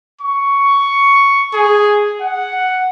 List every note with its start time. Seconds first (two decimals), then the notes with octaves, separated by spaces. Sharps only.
0.21 C#6
1.53 G#4
2.21 F#5